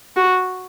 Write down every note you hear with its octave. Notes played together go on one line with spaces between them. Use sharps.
F#4